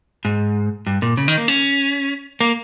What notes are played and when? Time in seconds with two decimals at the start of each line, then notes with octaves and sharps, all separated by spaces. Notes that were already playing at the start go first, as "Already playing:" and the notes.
0.25 G#2
0.87 G2
1.02 A#2
1.17 C#3
1.28 D#3
1.38 A#3
1.48 C#4
2.40 A#3